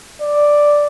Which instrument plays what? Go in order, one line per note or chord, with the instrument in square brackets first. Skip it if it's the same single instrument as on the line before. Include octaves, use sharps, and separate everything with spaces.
[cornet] D5